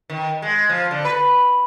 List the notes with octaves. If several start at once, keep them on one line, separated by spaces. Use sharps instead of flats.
D#3
G#3
F3
D3
B4